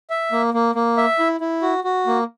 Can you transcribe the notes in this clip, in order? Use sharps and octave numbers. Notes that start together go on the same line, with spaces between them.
E5
A#3
A#3
A#3
E5
E4
E4
F#4
F#4
A#3